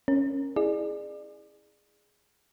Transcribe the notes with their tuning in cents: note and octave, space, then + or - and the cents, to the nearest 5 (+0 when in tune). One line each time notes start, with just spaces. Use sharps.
C#4 -10 A#4 +0
E4 -10 G#4 +0 D5 +30